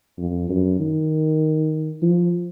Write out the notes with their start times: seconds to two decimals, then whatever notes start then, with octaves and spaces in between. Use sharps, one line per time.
0.18 F2
0.49 F#2
0.80 D#3
2.02 F3